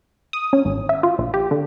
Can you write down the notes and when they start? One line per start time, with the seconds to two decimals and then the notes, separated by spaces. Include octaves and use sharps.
0.33 D#6
0.53 C#4
0.65 G#1
0.89 E5
1.03 F4
1.19 A#1
1.34 G4
1.51 D3